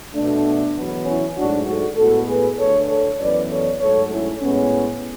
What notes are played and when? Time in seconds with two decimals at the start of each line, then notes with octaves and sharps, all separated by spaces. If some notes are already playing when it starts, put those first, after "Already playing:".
0.14 B2 A3 D4
0.75 E2 B2 F#3 B3
1.05 C#4 E4
1.36 G#2 F#3 A3 D4 F#4
1.67 F#4 A4
1.97 A2 G#3 B3 F#4 A4
2.28 G#4 B4
2.58 D2 D3 A3 A4 C#5
2.88 A4 C#5
3.19 F#2 E3 B3 B4 D5
3.50 A4 C#5
3.80 G#2 F#3 A3 A4 C#5
4.11 C#4 E4
4.41 A2 G#3 B3 C#4